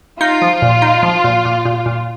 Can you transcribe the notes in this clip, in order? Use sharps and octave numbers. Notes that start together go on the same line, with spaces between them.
D#4 F4
F3
A#2
D#4
F3
A#2
A#2
A#2
A#2